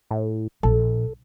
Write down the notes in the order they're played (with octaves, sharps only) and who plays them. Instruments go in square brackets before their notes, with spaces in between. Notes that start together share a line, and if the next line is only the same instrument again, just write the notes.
[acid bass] A2
[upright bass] A#1 [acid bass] A4